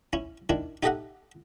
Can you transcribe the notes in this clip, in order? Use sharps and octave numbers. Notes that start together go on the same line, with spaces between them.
C#4 E4
D#3 D4 E4
D#4 G4 A4 D#5 E5 F#5